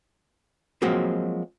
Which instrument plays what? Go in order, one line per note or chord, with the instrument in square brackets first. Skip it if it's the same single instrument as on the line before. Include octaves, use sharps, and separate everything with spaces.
[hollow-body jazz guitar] F3 F#3 G#3 A#3 C4 F#4